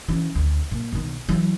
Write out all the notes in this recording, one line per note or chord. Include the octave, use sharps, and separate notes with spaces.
E3 C#4
D2
A#2
B1 D#3
E3 F#3